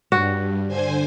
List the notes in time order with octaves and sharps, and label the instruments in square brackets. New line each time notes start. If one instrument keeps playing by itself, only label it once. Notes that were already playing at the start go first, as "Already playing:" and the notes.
[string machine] G2 [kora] F#4
[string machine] D3 C5 G#5